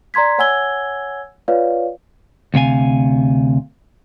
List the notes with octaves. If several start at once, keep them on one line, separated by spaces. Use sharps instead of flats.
D5 A#5 C6 G#6 B6
C#5 F#5 G#5 E6 G#6 G7
F4 B4 C#5 D5 F5
D2 C3 F5 G#5